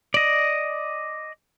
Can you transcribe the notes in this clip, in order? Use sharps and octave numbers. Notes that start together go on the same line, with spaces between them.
D5 D#5